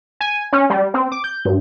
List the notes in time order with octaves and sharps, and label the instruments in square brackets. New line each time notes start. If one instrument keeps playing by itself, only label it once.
[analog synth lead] G#5
C#4
G3
C4
D6
G6
G2